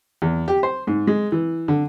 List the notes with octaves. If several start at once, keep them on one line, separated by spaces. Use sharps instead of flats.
E2
G4
C5
G#2
G#3
E3
D3